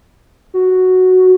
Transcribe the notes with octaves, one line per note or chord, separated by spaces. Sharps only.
F#4